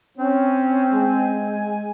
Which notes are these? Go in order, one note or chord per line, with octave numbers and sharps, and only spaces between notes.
C4 C#4
G#3 G#5